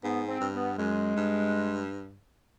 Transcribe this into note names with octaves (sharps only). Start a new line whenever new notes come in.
G#2 B3
C4
G2
B3
F#2 G#3
G2